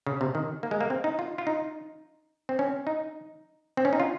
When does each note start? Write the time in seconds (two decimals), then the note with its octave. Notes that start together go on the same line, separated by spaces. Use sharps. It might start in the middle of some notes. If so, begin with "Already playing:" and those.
0.07 C#3
0.21 C3
0.35 D#3
0.63 A#3
0.71 G#3
0.81 A#3
0.90 C4
1.04 D#4
1.19 F4
1.38 F4
1.47 D#4
2.49 C4
2.59 C#4
2.87 D#4
3.77 C4
3.85 C#4
3.93 D#4
4.00 F4